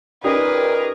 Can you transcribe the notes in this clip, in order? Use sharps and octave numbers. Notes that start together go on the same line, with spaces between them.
A#2 C#4 D#4 G4 G#4 A#4 B4